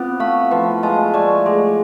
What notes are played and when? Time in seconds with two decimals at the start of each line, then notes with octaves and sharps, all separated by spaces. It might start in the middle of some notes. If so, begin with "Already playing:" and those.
Already playing: B3 C4 F4
0.20 A3 F5
0.51 F3 B4
0.83 G#3 A5
1.14 A3 D5
1.46 G#3 G#4